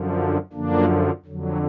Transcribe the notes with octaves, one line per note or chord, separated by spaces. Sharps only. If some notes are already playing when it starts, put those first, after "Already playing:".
Already playing: F#2 D3 F3
D4 F4
F#2 D3 F3 A#3 D4
F2 D3 F#3